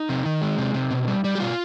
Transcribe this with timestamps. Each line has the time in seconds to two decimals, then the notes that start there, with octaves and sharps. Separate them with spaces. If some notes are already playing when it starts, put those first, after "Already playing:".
Already playing: D#4
0.09 C3
0.26 D#3
0.41 G#3
0.58 C3
0.74 C3
0.91 B2
1.08 G3
1.24 G3
1.35 G4
1.40 B2 F4